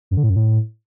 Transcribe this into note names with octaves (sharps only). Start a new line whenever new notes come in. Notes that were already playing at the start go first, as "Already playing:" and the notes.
F#2
D3
A2
F#2
A2